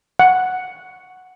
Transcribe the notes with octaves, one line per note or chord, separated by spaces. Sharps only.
F#5